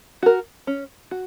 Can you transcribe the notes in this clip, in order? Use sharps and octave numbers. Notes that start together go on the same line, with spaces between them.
F#4 A#4
C#4
F#4